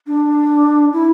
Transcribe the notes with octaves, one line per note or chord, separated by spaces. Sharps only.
D4
E4